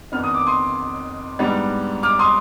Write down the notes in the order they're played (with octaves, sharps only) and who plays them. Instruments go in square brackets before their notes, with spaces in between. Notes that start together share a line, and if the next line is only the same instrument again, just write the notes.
[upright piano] F2 D#3 B3 D4 F6
D#6
D6
C6 D#6
G#2 G3 B3 D4
D6 F6
C6 D#6